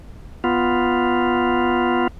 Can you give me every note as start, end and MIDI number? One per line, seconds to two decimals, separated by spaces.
0.44 2.07 59
0.44 2.07 65